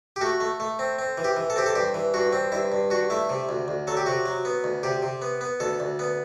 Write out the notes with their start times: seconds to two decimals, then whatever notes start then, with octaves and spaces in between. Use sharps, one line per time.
0.16 G4
0.21 A3 F#4
0.40 A3
0.60 A3
0.79 C4
0.99 C4
1.18 E3
1.24 G4
1.37 E3
1.50 A4
1.56 C4 G4
1.66 A4
1.75 G2 G4
1.94 E3
2.14 G2 F#4
2.33 C4
2.52 G2 E4
2.72 G2
2.90 G2 F#4
3.10 A3 E4
3.29 C3
3.49 D2
3.68 D2
3.87 F#3 A4
3.97 G4
4.06 C3 F#4
4.26 F#3
4.45 B3
4.64 D2
4.83 C3 G4
5.02 C3
5.22 B3
5.41 B3
5.60 D2 A4
5.80 D2
5.99 B3